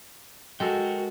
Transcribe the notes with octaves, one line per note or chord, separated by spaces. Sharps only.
G#3 F#4 A4 A#4 G5